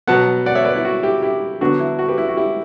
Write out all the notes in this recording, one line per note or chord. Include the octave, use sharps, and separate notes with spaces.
B2 F#3 B3 F#5 A5
D5 F#5
C#5 E5
B4 D5
E4
F#4
E4 G4
E4 G4
D3 F#3 B3 D4 F#4
E4
F#4
G4 B4
E4
F#4
E4 G4